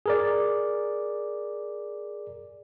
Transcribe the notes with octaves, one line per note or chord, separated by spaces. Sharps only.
G#4 A#4 D5